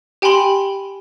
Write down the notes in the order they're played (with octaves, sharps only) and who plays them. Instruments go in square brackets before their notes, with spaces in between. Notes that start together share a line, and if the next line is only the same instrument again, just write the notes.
[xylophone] G4 G5 G#5 B5 C6 F#7